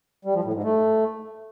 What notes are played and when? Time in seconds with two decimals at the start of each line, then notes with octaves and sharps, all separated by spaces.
0.25 G3
0.35 F3
0.44 A2
0.54 G#2
0.63 A3